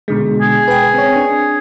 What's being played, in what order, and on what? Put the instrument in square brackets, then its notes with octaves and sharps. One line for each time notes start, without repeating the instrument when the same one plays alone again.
[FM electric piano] B2 D3 G#3
[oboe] G#4
[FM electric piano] B4 G5
C4 C#5
D4